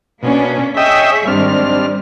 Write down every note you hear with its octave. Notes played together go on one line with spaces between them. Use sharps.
B2 A#3 C#4 D4
G#4 C#5 D#5 E5 G5 E6
G#2 D#3 G3 C4 D4 F6
G3